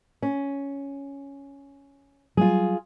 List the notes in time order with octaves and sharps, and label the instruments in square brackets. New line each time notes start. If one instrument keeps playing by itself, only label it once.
[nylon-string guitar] C#4
[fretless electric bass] F#3 G3 [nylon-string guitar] F4 G#4